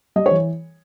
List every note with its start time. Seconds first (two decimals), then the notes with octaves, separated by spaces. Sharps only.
0.16 G3 D#5
0.26 C#5
0.31 E3